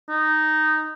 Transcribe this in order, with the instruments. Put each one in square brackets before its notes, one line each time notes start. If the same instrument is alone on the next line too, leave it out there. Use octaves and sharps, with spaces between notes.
[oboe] D#4